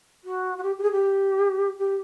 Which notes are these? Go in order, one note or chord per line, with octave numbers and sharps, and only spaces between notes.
F#4
F#4
G4
G4
G#4
G4
G4